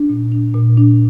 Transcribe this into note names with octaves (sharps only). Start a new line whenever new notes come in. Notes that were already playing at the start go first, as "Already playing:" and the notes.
Already playing: D4
A#2
D4
A#2
D4